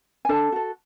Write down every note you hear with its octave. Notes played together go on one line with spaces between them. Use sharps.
G#5
D4 A4 A5
F#4 A4